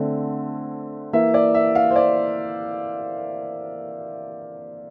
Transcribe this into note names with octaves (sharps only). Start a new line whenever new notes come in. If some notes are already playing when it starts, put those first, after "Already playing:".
Already playing: D3 A3 C4
E3 A#3 E5
D5
E5
F5
C5
D5